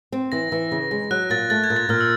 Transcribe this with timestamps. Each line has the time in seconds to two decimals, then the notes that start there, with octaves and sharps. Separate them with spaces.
0.12 C4
0.32 E3 A#6
0.52 E3
0.72 C#3
0.91 G#3
1.11 F#3 F#6
1.30 A#2 A6
1.50 A3 A6
1.64 G#6
1.70 A#2
1.76 A6
1.89 A#2 F6
2.01 E6